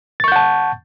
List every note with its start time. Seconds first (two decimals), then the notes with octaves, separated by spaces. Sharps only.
0.20 A6
0.24 C#6
0.28 G6
0.32 F#5
0.36 A5